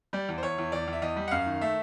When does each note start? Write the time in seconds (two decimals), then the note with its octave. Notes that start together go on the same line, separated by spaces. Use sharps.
0.13 G3 D5
0.29 E2
0.38 C5
0.43 E2 C#5
0.58 E2
0.72 E2 D5
0.88 E2
0.93 E5
1.02 E2 D#5
1.16 G3
1.28 F#5
1.31 F#2 F5
1.46 D#3
1.61 A3 E5